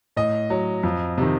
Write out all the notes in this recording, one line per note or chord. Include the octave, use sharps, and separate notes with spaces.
A2 D#5
F#3
F2
C3 D#3